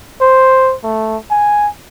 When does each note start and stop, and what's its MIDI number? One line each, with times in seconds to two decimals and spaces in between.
0.21 0.75 72
0.84 1.17 57
1.31 1.69 80